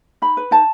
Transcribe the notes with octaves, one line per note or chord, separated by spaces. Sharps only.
D#4 B5
B4
D#4 A5